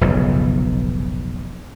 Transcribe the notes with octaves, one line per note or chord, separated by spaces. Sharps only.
F1 B1 G#2 C#3